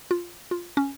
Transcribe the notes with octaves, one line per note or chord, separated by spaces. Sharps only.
F4
F4
C#4